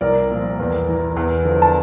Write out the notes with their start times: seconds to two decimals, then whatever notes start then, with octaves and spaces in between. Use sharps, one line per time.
0.01 C2 A#4 D5
0.30 A#2 F3
0.59 E2
0.88 E3
1.16 E2
1.45 D3 F3
1.62 A5